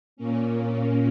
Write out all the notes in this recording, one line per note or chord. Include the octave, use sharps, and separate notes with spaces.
A#2 A#3 C#4